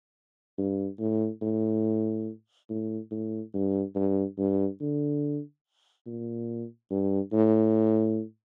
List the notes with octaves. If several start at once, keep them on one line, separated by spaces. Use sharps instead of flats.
G2
A2
A2
A2
A2
G2
G2
G2
D3
A#2
G2
A2